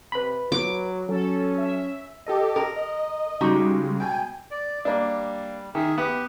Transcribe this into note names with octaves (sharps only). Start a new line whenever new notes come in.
C3 B4 B5
F#3 D6
F#3 C#4 A4
E5
G4 A4 D#5
A#4
D#5
C#3 G3 G#3 D#4 F#4 G4
B2 G5 G#5
D5
G3 A#3 D4
D#3 G#4 E5
B3 G4